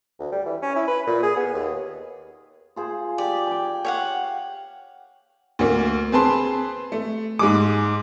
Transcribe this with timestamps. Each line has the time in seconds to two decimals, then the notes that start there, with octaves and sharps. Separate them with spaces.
0.19 D2
0.32 G3
0.46 E3
0.62 C#4
0.76 E4
0.88 B4
1.07 A#2
1.23 G#4
1.37 B3
1.54 D#2
2.76 F4 G#4 C5
3.18 G4 D5
3.47 G5 G#5
3.85 C#5 F5 F#5
5.59 D2 A#3
6.12 C4 G#4 B4 A5 C6
6.92 A3
7.39 G#2 G#3 D6